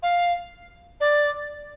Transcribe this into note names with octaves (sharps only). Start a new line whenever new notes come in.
F5
D5